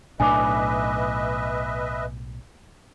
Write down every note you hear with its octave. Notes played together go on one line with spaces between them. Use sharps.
B1 A2 D4 B4 D#5 E5 G#5 D6